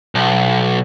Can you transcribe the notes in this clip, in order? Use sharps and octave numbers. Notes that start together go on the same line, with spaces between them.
B1